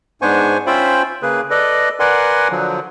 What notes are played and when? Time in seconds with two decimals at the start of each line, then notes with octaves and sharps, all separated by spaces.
0.22 G#2 B3 D4 C5 G#5 C#6
0.67 C#4 F4 C5 E5 G5 B5
1.22 C#3 A#3 G#4 B4
1.50 A4 B4 D5 D#5
2.00 A#4 B4 D5 F#5 G#5 C6
2.51 D3 F3 F#3